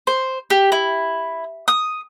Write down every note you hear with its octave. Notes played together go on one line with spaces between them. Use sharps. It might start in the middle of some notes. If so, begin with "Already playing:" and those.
C5
G4
E4
D#6